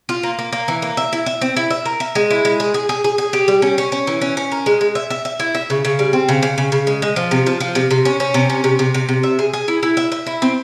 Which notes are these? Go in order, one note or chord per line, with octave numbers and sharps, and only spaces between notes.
F4
A#3
A#3
A#3
E3
A#3
E5
E4
E5
C4
E4
E5
A#4
E5
G#3
E4
G#3
G#4
G#4
G#4
G#4
G#4
G4
G3
C#4
C#4
C#4
E3
C#4
C#4
A#4
G#3
G#3
E5
E5
E5
E4
E5
C#3
C#3
G3
C4
C#3
C#3
C#3
C#3
G#3
G#3
F3
C3
F3
F3
C3
C3
C#4
C#4
C3
C#4
C3
C3
C3
C3
E5
G#4
G#4
E4
E4
E5
E5
E4
C4